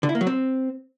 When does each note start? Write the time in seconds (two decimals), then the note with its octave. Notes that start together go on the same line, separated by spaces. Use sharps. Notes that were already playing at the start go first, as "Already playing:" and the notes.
0.03 D3
0.09 E4
0.15 A#3
0.21 F#3
0.27 C4